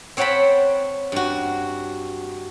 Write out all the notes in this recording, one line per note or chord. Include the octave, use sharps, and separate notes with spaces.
C4 C#5 F#5 G5 A5 B5
G2 F#4